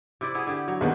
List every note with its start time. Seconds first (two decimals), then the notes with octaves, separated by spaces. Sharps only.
0.21 C3 E4 D5
0.35 B3 E4 G#4
0.47 D3 G4
0.68 F#3
0.81 D#2 D#3 B3